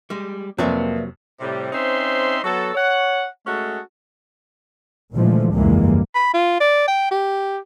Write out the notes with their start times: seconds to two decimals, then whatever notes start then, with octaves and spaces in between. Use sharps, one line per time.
0.10 G3 G#3
0.58 F2 C3 F#3 A#3 B4 D5 E5
1.40 A2 C3 G3
1.72 C4 C#4 D#4 C5 E5 C6
2.44 F#3 B3 F#4 A4
2.75 C#5 F#5
3.46 G#3 A3 C#4 F#4 G#4 A4
5.14 A#2 D3 E3 F3 G#3 A3
5.53 F1 C#2 G2 E3 G#3 A#3
6.15 B5
6.34 F4
6.60 D5
6.88 G5
7.11 G4